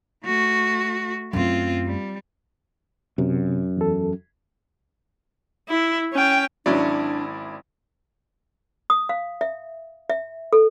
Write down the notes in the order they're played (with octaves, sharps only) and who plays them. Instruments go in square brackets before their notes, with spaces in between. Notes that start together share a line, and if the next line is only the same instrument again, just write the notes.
[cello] A3 F#4
[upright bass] F#2 A3 [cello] C4 F4
[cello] G3
[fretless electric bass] F#2 [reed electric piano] C3
[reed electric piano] E2 A4
[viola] E4
C#4 G5
[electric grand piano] G#1 E4 D5 [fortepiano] F#3 C#4 [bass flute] D4
[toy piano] D#6
F5
E5
E5
A4